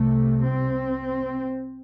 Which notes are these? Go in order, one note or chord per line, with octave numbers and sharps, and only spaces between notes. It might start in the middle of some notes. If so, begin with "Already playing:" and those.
Already playing: C2 C3 A3
C4